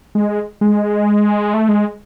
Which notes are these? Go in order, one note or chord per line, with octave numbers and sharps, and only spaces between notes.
G#3
G#3
A3
G#3